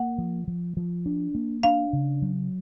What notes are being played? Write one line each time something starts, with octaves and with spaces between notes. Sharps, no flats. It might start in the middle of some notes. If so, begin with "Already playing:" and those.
Already playing: A#3 F#5
F3
F3
F3
D4
A#3
D4 F5
C#3
F#3